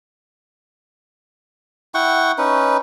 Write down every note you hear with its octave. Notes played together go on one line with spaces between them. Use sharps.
E4 F#5 G5 C#6
C#4 D#4 B4